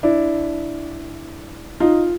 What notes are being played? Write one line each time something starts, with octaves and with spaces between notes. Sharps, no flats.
D4 E4
D#4 F4